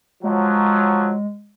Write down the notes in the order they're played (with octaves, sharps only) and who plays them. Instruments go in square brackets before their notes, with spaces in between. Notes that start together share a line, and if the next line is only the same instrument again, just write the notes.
[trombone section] F3 F#3 [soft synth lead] G#3